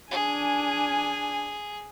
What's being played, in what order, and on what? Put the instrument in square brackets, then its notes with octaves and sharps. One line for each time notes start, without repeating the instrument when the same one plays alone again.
[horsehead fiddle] D4 G#5 [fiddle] G#4